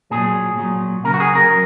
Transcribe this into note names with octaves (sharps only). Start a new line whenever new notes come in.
A#2 F#3 G#4
A#2 F#3
C#3 F#3 A#4
F#4
G#4
A#4
F#3